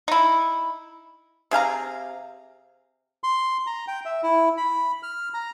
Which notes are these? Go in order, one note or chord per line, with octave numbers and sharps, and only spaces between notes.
D#4 E4
C3 G#4 F5 A#5
C6
A#5
G5
E5
E4
B5
F6
A#5